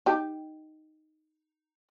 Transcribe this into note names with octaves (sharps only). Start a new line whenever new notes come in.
D#4 G4